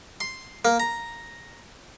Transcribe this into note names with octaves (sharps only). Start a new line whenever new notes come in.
C6
A#3
A#5